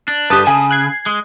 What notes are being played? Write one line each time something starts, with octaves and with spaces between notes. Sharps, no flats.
D4
G2 G4 B4 A5 D#6
C#3 G#5
F#6 G#6 C7
G#3